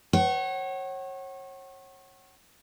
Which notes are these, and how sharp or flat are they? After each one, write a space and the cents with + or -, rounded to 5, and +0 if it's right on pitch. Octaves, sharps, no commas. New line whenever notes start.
C#5 -30 F#5 +35